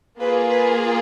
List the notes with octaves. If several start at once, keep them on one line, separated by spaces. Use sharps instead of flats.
A#3 F4 G#4 B4
B4